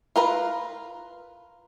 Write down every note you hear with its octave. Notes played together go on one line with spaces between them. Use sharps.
F4 A#4 B4